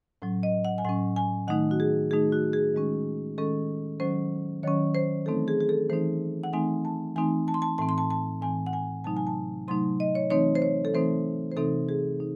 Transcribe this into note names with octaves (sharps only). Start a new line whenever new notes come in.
A2 F#3 C#4
D#5
F#5
G#5
A2 F#3 C#4 F#5
G#5
D#3 A3 D#4 F#5
F#4
G#4
D#3 A3 D#4 G#4
F#4
G#4
D#3 G#3 C#4
D#3 G#3 C#4 A4
D#3 F#3 C#4 C5
D#3 F#3 C#4 C#5
C5
E3 A3 C4 D#4 A4
G#4
G#4
A4
E3 A3 C4 D#4 C5
F#5
E3 A3 C4 D#4 G#5
A5
E3 A3 C4 D#4 G#5
A5
C6
A5
A2 E3 C4 A5
C6
A5
A5
A2 E3 C4 G#5
F#5
G#5
C3 F#3 A3 D#4 A5
G#5
A5
C3 F#3 A3 D#4 C6
D#5
C#5
E3 A3 C4 D#4 C#5
C5
C#5
A4
E3 A3 C4 D#4 C5
C5
C3 E3 C4 D#4 A4
G#4
D#4